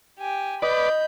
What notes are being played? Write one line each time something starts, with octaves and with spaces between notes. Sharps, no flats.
G4 G#5
B4 D5 D#5 B5 G6